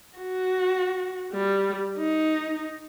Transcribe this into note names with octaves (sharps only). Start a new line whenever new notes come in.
F#4
G3
D#4